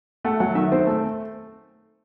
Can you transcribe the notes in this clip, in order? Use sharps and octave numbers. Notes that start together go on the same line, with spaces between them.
A3 F#5
F#3 F#5
D#3 E5
C4 C5
A3